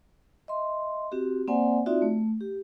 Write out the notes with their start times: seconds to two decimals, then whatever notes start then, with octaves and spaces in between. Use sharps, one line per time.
0.48 D#5 E5 C6
1.12 C4 F#4 G4
1.48 A#3 C4 C5 D5 F#5 G#5
1.86 C4 D#4 F4 F#4 D5 E5
2.02 A3
2.41 G4